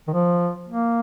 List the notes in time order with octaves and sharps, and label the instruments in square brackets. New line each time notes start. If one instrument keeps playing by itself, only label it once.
[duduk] D#3
F3
A#3